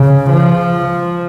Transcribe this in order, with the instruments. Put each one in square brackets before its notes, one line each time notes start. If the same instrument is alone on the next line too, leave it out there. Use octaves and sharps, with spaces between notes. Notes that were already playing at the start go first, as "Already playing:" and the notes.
Already playing: [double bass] C#3
F3